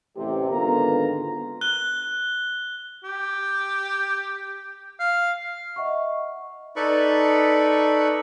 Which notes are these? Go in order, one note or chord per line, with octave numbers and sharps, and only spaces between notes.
A1 C3
G#1 D3 B3 F4 A#4 A#5
F#6 G7
G4
F5
D#5 E5 F#5 C#6
D#4 A4 B4 D5 B5 C#6